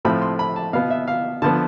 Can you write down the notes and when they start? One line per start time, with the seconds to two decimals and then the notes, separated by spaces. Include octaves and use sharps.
0.05 A2 F3 A3 C4 B5
0.22 C6
0.39 B5
0.56 A5
0.73 B2 B3 F5
0.90 E5
1.08 F5
1.42 D3 F3 B3 A5